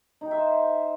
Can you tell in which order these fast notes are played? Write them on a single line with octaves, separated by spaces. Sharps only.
D#4 G5 E5 C5